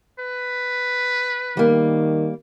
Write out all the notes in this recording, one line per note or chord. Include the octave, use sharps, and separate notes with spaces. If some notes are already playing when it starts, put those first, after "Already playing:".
B4
D#3 G3 A#3